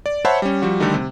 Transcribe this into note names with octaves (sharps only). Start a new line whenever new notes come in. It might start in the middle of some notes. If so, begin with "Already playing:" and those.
D5
C5 C#5 E5 F#5 A5 B5
G3 C#4
F3 G3 F#4
D3 D#3 G3 A3 D#4
C3